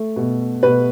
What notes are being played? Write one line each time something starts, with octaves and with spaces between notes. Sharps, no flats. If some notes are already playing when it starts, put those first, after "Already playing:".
Already playing: A3
B2
B2 B4